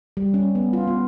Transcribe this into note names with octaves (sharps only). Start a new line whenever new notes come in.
G3
C#4
B3
F4
B3